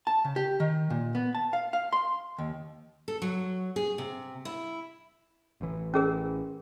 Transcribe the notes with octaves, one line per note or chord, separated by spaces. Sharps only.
A5
C#3
G4
D#3
A#2
B3
A5
F5
F5
C6
D#2
A4
F#3
G#4
C3
E4
A1 E3
C#4 G#4 A#4